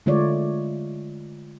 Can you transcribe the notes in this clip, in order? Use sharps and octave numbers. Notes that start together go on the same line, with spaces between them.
D3 G#3 A3 F4 C#5 D5